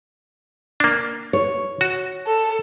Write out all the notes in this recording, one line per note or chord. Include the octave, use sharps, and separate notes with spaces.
A#3 D4
C#5
F#4
A4